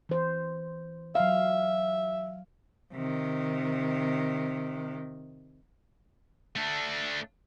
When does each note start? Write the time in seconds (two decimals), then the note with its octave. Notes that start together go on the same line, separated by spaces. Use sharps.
0.09 E3 C5
1.15 F#3 E5 F5
2.93 C3 D#3
6.56 A3 D4